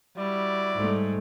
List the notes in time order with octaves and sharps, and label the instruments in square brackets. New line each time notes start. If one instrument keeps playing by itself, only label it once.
[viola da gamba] G3 [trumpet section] E4 F#4 D5
[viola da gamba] G#2 [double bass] G3 A3